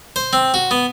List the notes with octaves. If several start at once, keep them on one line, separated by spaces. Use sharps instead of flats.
C5
C4
F#4
B3